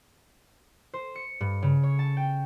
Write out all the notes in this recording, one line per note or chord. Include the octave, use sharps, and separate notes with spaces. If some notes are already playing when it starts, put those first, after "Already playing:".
C5
C#7
G2
C#3
C#5
A5
G5